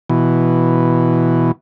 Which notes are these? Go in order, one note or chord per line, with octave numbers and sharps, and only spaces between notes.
B2 E3